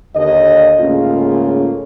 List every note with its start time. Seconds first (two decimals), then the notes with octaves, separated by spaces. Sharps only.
0.15 D#2 D3 D#5
0.79 G#2 C#3 A3 A#3 C#4 F4